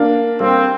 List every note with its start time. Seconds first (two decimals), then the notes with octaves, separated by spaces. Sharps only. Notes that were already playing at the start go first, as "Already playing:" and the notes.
Already playing: A#3 D4
0.40 G3 A#3 C4